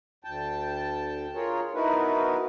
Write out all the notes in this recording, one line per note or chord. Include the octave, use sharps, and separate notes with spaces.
D2 G5 A5
F4 G#4 A#4 C#5
B3 D#4 E4 F#4 A#4 B4